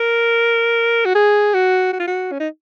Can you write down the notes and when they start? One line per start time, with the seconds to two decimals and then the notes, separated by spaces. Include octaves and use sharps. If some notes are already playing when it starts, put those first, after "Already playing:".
Already playing: A#4
1.05 F#4
1.15 G#4
1.54 F#4
1.93 F#4
2.00 F4
2.07 F#4
2.32 C#4
2.40 D#4